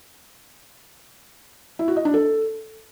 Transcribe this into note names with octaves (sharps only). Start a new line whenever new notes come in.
E4
F#4
D#5
D4
A4